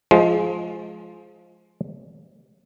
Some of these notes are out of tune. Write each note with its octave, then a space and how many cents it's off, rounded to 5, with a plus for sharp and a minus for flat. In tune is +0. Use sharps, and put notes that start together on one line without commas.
F3 +0 G#3 +20